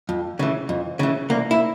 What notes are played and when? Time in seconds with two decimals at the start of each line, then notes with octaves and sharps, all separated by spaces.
0.09 F2
0.39 C#3 E3
0.69 F2
0.99 C#3 E3
1.30 C2 A#3
1.51 E4